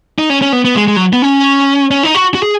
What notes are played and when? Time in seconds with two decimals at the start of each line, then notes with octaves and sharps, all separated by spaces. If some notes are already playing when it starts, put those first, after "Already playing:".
0.19 D#4
0.30 C#4
0.42 C#4
0.52 B3
0.65 B3
0.76 G#3
0.88 G#3
0.96 F#3
1.13 B3
1.22 C#4
1.91 C#4
2.03 D#4
2.15 F#4
2.35 F#4
2.43 G#4